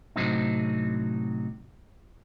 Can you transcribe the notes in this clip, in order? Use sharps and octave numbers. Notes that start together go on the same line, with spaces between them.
A2 C3 F#3 C4 D#4